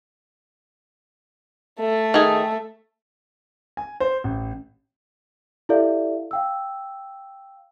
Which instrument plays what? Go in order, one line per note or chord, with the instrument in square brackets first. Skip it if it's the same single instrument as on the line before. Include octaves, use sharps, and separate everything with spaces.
[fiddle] A3
[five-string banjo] D#3 G#4
[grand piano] G#5
C5
A1
[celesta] E4 G4 A4 D5 E5 F5
F5 G5 E6